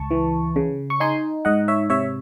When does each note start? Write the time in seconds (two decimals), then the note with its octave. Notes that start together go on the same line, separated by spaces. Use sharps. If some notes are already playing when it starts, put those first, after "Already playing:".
Already playing: C#2 A5 C#6
0.11 E3
0.56 C#3
0.90 C#6
1.00 D#4 G#5 C6
1.45 G#2 D#5 F#5
1.68 C#5 E5
1.90 C3 C#5 E5